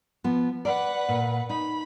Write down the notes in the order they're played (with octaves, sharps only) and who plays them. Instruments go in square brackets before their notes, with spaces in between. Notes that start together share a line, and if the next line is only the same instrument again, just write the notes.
[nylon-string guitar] F3 B3
[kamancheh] B4 F#5 [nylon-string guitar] D5
[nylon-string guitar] A#2
[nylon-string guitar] D#4 [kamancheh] B5